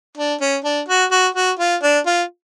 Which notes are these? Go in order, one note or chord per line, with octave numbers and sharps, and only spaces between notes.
D4
C#4
D4
F#4
F#4
F#4
F4
D4
F4